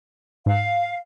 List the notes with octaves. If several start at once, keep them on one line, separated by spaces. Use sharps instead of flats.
G#2 F5